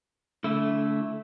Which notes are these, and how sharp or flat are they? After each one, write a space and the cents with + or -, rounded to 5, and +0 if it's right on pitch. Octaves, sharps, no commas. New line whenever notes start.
D3 -40 A3 -10 E4 +0